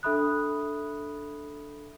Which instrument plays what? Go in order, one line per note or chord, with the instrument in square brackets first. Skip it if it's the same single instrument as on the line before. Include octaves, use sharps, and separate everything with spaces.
[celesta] D4 A4 E5 B5 D#6 F#6